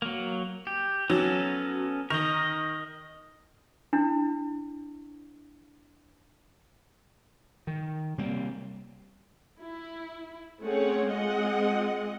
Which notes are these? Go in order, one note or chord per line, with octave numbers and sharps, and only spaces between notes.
F#3 A#3
G4
F#3 B3 C#4 A4
D#3 A#4 D#5
D4 E4
D#3
C3 G3 A#3 C4
E4
A3 C4 C#4 G#4 C#5 F#5
G#3 C4 F4 G#4 D#5 F#5